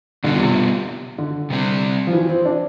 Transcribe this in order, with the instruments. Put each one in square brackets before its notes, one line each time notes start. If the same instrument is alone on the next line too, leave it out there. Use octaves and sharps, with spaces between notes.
[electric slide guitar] B2 G3 B3 F4 [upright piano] D3
[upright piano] C3
D3
[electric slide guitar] C3 G3 C4
[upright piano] F3
E3
C4
D4